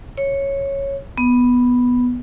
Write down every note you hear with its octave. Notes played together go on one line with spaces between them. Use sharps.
C#5
B3